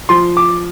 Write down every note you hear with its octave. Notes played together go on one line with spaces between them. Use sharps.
F3 C6
D6